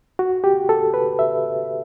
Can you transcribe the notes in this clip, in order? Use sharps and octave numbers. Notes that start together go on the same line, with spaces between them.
F#4
G4
A4
B4
E5